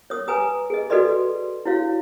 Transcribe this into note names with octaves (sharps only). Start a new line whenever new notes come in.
C#5 D#6
B4 G#5 A#5 D#6
G#4 D#5
F#4 A4 B4 D5 D#5 C6
E4 F#4 C#5 F5